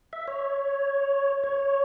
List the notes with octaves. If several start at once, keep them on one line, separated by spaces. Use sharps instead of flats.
E5
C#5
C#5